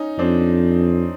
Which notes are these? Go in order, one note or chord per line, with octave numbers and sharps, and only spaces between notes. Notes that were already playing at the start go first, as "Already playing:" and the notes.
Already playing: C#4 D#4
F2 C4 D4